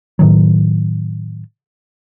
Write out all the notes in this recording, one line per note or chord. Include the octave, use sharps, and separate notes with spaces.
A2 D#3 F#3